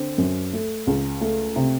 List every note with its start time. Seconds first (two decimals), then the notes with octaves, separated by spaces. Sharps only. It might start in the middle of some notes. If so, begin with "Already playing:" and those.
Already playing: D3 C4
0.18 F#2
0.53 A3
0.87 C#2
1.21 A3
1.56 C3